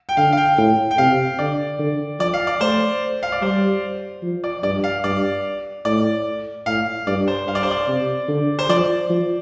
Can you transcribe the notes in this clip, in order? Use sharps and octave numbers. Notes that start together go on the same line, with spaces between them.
G5
D3 F5
F5
G5
A2 G5
G5
C3 F5
D3 D5
D3
F3 D5
F5
D5
A3 C5
F5
D5
G3 C5
F3
D5
G2 D5
F5
G2 D5
A2 D5
A2 F5
G2 D5
C5
G2 F5
D5
C5
D5
C3
D3
C5
F3 D5
F3